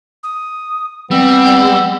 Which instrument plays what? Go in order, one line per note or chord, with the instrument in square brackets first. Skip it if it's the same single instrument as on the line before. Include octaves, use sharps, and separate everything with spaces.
[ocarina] D#6
[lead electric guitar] G3 [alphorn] B3 [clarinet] C4 [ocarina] E6